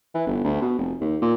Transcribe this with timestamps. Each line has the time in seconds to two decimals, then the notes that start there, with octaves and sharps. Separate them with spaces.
0.15 E3
0.27 G1
0.44 D2
0.62 B2
0.78 F1
1.01 D#2
1.22 A#2